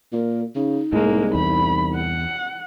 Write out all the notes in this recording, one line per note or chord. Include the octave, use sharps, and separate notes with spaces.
A#2 A#4
C#3 D#4
C2 A2 G#3 A#3
E2 B5
F#5